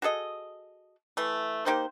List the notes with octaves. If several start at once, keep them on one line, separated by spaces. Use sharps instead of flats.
F#4 G#4 A4 D#5
E3 A3
A#3 D#4 G4 C5